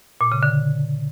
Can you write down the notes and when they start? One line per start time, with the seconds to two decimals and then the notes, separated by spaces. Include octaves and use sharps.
0.21 A#2
0.32 C#3
0.43 D3